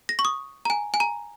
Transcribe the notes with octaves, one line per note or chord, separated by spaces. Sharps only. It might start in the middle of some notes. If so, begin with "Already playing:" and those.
A#6
C#6
D#6
A#5
G#5
G#5
A#5